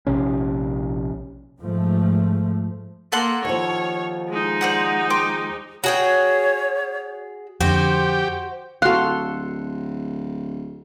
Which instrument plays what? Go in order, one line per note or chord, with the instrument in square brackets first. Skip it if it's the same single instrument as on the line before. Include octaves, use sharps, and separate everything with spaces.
[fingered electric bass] A#1 C3 C#4
[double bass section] G#2 F3 A3
[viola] A#3 [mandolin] A4 F#5 C6
[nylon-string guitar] D#2 F3 [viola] C#5
[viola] G#3 D#4
[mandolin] C5 D5 F#5
G5 C6 D6
[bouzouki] F#4 G#4 G5 [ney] C#5
[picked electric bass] F2 D3 [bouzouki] F#4 C5 [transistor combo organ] G4
[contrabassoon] D1 [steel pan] F#4 F5 [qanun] A4 C6 [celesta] F#6